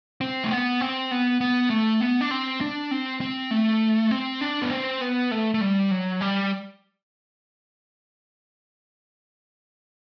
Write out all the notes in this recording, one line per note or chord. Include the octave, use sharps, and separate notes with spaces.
C4
A3
B3
C4
B3
B3
A3
B3
D4
C4
D4
C4
C4
A3
C4
D4
B3
C4
B3
A3
A3
G3
F#3
G3